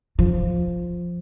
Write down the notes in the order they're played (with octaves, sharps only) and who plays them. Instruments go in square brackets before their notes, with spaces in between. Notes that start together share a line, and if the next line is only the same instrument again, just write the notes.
[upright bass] F3